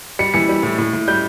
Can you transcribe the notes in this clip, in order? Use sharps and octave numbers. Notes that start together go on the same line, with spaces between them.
G3 C#7
E3 C#7
G3
A2
A2
A2
G3 G6